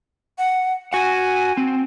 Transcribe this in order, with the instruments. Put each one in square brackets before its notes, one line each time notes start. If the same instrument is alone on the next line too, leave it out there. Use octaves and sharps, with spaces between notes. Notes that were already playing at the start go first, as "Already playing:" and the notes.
[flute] F#5
[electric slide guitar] F#4 F#5 [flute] G#5
[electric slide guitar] C4